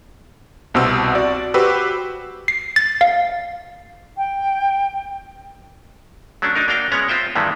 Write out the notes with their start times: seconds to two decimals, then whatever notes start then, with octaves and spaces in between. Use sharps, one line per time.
0.74 C2 B2 C4 E6
1.15 F#4 D5
1.54 F#4 G4 B4 C5 E6
2.48 C7
2.76 A6
3.01 F5
4.17 G5
6.42 F#3 A3 C#4 D4
6.55 D4 D#4 A#4
6.68 A#3 D4 F#4 F5 G5
6.92 G#3 B3 C#4 C#5 A#5
7.08 C4 F4 C5 E5 G5
7.35 G2 D#3 E3 G#3 A3 B3